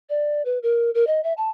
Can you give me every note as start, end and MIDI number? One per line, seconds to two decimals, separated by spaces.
0.09 0.42 74
0.45 0.59 71
0.63 0.90 70
0.95 1.07 70
1.07 1.21 75
1.24 1.33 76
1.37 1.50 81